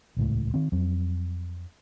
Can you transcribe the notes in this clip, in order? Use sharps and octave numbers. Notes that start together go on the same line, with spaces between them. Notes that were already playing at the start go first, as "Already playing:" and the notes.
D#1 C#2 A2
D#3 C4
F2 F#3 C4